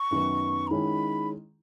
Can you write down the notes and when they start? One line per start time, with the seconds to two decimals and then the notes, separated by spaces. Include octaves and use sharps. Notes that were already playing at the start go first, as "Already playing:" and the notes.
Already playing: C#6
0.11 F#2 D#3 F#3 B3
0.67 A#5
0.70 D#3 G#3 C#4 E4 B5